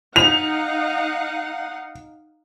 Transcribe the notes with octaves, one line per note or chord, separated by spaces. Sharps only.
D#4 F5 F#5 F7